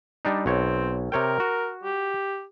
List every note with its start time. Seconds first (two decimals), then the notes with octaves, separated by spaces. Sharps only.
0.25 G3 D4 D#4
0.46 B1 C4 C#5
1.12 C3 A#4 C#5 G5
1.40 F#4
1.84 G4